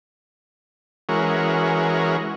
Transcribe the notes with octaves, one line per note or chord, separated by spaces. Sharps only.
E3 G#3 C#4 F#4 A#4